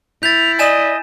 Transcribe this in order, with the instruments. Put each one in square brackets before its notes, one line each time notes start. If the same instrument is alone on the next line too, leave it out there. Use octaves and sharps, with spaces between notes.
[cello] E4 [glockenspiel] G6 A6 [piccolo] F7
[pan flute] D5 [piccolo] D#5 [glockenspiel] G#5 E7